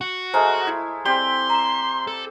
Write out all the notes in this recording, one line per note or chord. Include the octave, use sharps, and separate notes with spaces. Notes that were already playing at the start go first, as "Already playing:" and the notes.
F#4
G#3 A3 C5 A#5 F6
E4
G3 C4 G4 C6
A#5 E7
A4